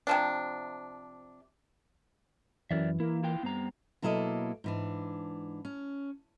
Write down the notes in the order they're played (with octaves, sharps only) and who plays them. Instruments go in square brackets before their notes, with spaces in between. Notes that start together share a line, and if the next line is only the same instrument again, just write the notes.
[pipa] C3 F3 D4
[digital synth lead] F#2 [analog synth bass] E3 [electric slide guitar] A#4 D5 E5
[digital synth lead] A#3 [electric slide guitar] E4
[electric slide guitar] E4 F4 G5
[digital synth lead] G2 [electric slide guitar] B3 C4 A#5
[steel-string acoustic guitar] B2 F#3 A#3 E4 A4 D#5
G#2 E3 D4
C#4